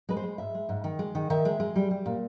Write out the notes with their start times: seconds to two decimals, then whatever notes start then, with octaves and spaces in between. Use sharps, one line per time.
0.09 G#3 B4
0.17 C5
0.23 G#3
0.38 G#2 E5
0.54 G#3
0.69 G#2
0.84 D#3
0.99 G#3
1.15 D#3
1.30 D#3 E5
1.45 G#3
1.60 G#3
1.76 G3
1.91 G3
2.06 A#2